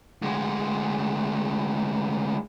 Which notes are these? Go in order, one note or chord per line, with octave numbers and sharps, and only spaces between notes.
D2 G#3